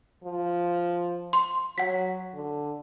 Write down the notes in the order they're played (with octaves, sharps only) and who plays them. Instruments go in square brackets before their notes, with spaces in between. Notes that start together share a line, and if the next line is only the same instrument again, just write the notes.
[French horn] F3
[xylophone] C6
[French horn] F#3 [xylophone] F#5 B6
[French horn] D3